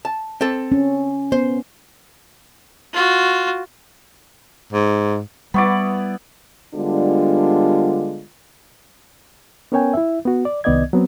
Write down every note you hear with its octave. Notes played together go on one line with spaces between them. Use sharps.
A5
C4 A4
C#4
B3 C5
F4 F#4
G#2
G3 B3 E4 D5 B5 C#6 D6
D3 G3 G#3 B3 D4 F4
B3 C#4 A#4 C#5 G5 G#5
E4 E5
B3 F#4
D5
C2 D#3 B3 D5 D#5 G#6
F#3 B3 C4